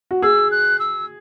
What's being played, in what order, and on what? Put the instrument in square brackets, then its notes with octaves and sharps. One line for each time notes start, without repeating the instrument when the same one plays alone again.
[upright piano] F#4
[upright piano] G#4 [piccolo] E6
[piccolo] F#6
E6